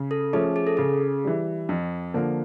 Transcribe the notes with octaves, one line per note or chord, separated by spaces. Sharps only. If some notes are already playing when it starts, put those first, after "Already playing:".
Already playing: C#3
A4
F3 A3 C#4 G#4
G#4
A4
C#3 G#4
E3 G3
F2
D3 F3 A#3